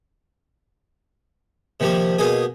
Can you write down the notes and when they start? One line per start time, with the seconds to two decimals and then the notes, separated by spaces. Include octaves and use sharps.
1.80 C3 D#3 F3 G3 A#3
2.18 B2 A#3 D#4 G#4